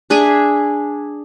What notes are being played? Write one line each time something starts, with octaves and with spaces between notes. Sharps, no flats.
D4 G#4 E5 G#5